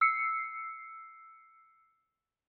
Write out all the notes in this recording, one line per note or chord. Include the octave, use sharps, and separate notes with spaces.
E6 C7 C#7